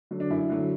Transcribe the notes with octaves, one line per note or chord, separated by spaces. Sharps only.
D3 F#3
D4
F#2 E4
D3 F#3